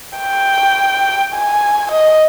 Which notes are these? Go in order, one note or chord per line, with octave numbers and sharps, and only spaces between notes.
G5
G#5
D#5